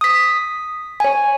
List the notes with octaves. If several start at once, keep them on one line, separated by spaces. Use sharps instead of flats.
D#6 B6
C#5 G#5